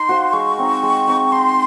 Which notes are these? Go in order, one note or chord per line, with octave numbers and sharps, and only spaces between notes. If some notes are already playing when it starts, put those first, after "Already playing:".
Already playing: D#4 C6
F#4 C5 F5
G#3 C#6
C4 D#4
G#3
C4 D#4
D#4 C6